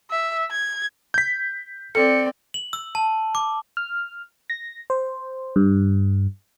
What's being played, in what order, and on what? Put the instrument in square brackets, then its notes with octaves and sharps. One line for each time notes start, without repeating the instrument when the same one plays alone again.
[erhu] E5
G#6
[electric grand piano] G6 B6
[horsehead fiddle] C4 D5 [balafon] A4 [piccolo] C#7
[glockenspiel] F#7
E6
A5
D6
[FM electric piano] F6
A#6
C5
G2